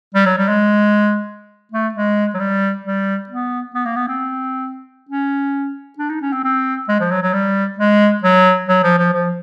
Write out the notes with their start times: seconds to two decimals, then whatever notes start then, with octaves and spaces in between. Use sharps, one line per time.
0.15 G3
0.26 F#3
0.38 G3
0.49 G#3
1.72 A3
1.94 G#3
2.34 F#3
2.40 G3
2.85 G3
3.29 B3
3.74 B3
3.85 A#3
3.96 B3
4.08 C4
5.09 C#4
5.99 D4
6.10 D#4
6.22 C#4
6.33 C4
6.44 C4
6.88 G#3
7.00 F3
7.11 F#3
7.23 F#3
7.34 G3
7.78 G#3
8.24 F#3
8.68 F#3
8.83 F3
8.99 F3
9.13 F3